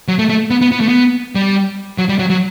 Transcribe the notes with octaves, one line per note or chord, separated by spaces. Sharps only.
F#3
A3
A3
B3
B3
B3
A3
B3
G3
F#3
G3
F#3
F#3